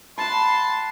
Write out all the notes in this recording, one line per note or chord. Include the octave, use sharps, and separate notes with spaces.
F#5 A5 B5 C6